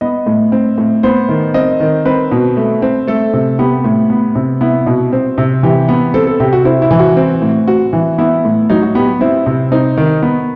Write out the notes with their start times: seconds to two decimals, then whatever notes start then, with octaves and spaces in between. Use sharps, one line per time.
0.01 B3 D#5
0.27 A2
0.52 C4
0.78 A2
1.03 B3 C5
1.29 D#3
1.54 C4 D#5
1.80 D#3
2.05 C4 B4
2.31 B2
2.57 A3
2.82 C4
3.07 A3 A4
3.33 C3
3.59 B3 G4
3.84 A2
4.10 B3
4.35 C3
4.61 B3 E4
4.86 B2
5.13 C4
5.38 C3
5.63 E3 G4
5.89 B3
6.14 C4 A4
6.27 A4
6.40 C3 G4
6.53 F#4
6.65 C4 E4
6.82 E4
6.91 E3
6.99 F#4
7.17 C4
7.42 A2
7.67 C4 F#4
7.93 E3
8.18 B3 E4
8.45 A2
8.70 F#3 D#4
8.83 F#4
8.95 B3 G4
9.21 C4 E4
9.46 C3
9.72 C4 D#4
9.97 D#3
10.22 B3